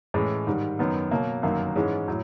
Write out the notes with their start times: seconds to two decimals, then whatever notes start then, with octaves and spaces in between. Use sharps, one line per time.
0.14 A2 E3 G#3 C#4
0.47 G#2 D#3 G3
0.79 F#2 D#3 F#3 B3
1.11 B2 F#3 A#3
1.43 G1 F#2 D#3 F#3 A#3
1.76 G#2 E3 G#3 C#4
2.08 A2 F#3